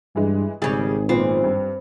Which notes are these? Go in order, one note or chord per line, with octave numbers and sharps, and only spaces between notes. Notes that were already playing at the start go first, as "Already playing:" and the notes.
G2 E3 G#3
G#1 C#3 G3 G#4
A#1 A#2 B3 C4
G2